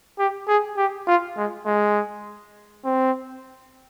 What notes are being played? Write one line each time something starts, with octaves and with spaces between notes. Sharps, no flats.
G4
G#4
G4
F4
G#3
G#3
C4